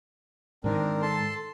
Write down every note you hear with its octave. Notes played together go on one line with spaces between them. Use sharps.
G#2 D#3 C4 D4 A#4
A4 A5 C6